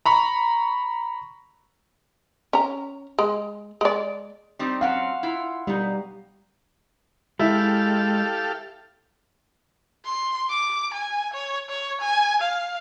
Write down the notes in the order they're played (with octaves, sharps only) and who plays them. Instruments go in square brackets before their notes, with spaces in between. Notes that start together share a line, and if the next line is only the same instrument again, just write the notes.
[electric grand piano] A#5 B5 C#6
[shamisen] C#4 A#5
G#3
G#3 D5
[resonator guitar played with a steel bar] G3 C4 D#4
[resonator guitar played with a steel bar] F#3 C4 C#4 [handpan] F5 F#5
[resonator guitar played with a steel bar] E4 F4
[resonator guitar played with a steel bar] B2 D#4 [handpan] G3
[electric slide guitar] G#3 [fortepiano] E4 [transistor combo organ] G4 A4 F5
[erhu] C6
D6
G#5
C#5
C#5
G#5
F5